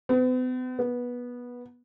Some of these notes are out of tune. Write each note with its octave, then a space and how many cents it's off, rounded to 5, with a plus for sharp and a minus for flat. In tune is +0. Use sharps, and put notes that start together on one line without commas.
B3 +45
B3 -15